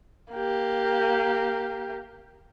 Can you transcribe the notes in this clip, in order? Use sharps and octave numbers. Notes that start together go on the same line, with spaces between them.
A#3 G4